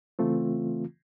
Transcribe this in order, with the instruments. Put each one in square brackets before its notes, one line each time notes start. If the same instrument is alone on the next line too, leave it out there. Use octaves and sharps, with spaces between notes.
[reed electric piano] C#3 E3 A3 C4 F4